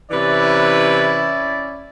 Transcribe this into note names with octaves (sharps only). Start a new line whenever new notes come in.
C3 E3 C#4 E4 B4 D5